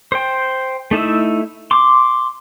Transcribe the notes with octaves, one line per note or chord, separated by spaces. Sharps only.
C5 G5
A3 D#4 E4 E5
C6 D6